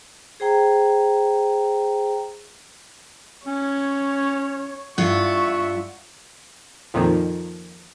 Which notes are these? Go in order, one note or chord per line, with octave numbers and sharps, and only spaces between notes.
G#4 C5 G5 A#5
C#4 C#5
G2 F4 E5 F#5 C#6
F2 A#2 D#3 F3